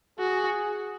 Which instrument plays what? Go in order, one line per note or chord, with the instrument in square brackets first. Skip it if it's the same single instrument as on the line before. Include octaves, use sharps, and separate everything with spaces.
[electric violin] F#4 [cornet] G#4